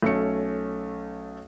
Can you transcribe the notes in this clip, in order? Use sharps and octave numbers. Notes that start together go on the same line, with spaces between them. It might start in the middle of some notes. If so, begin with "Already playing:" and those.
B1 A3 C#4 C#7